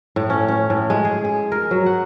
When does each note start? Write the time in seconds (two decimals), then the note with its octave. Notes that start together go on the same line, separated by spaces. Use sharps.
0.16 A2
0.30 C#4
0.48 C#4
0.70 A2
0.90 G#3
1.05 G#4
1.25 G#4
1.52 A#4
1.71 F#3
1.86 F#5